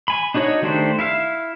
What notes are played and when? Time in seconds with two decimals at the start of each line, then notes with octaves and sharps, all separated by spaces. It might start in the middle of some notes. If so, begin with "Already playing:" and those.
0.08 G#5 B5
0.34 D4 D#4 F#4 C#5 D#5
0.62 D#3 A3 D4 G4 C5
0.99 E4 E5 F5